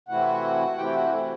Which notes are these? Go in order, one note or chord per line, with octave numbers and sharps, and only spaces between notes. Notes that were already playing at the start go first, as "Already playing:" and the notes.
C3 E3 A3 C4 E4 F#4 F#5
C3 E3 A3 C4 E4 G4 G5
F#4 F#5
A3 A4